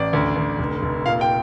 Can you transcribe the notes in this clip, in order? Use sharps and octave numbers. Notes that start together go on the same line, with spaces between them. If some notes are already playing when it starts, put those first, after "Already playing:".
Already playing: A1 D5
D2
D2
F1
F1
A#2 F5
G5